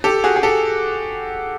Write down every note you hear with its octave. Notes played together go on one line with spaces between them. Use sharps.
G4 A4
F#4 G#4
G#4
G4 A4